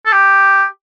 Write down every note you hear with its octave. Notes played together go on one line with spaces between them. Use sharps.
A4
G4